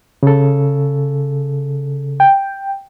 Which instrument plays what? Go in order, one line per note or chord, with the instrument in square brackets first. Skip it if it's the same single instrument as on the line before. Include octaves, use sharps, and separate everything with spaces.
[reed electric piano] C#3 A4
[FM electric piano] G5